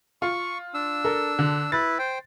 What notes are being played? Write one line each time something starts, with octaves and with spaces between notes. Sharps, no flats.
F4 C#6
D4 E6
A4 A#4
D3
E4 B4 A6
C5 G5